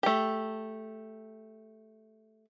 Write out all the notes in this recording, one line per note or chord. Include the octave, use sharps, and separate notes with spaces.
A3 G4